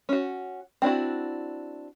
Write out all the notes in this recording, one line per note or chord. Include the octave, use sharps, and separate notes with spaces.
C#4 F#4
C4 D4 E4 F#4